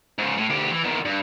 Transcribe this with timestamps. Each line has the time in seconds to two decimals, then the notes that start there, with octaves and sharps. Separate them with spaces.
0.19 G#2 C#3
0.38 A2
0.50 D2 G4
0.72 E3
0.84 E2 D#3
1.06 G2